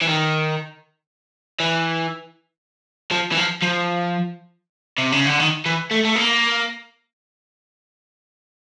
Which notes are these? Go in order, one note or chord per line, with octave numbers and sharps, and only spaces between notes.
E3
D#3
E3
F3
E3
F3
F3
C3
C#3
D3
D#3
E3
A3
A3
A#3